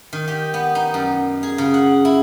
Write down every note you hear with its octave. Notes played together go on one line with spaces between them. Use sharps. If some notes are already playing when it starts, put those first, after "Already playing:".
D#3
G4
B3
D#4
F#2
G#4
C#3
F#5
E4